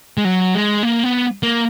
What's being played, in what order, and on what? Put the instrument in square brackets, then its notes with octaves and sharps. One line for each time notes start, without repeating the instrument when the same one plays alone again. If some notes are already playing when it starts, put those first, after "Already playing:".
[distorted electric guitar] G#3
F#3
G#3
A#3
B3
A#3